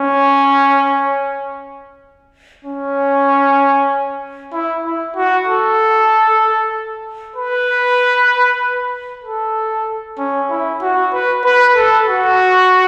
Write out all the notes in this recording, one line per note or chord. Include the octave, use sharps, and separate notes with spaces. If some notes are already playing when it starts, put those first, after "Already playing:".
Already playing: C#4
C#4
E4
E4
F#4
A4
B4
A4
C#4
E4
F#4
B4
B4
A4
F#4